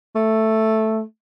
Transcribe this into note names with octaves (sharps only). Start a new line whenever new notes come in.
A3